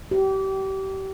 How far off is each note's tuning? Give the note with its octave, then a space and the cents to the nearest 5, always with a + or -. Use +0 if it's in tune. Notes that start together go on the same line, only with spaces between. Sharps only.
G4 -30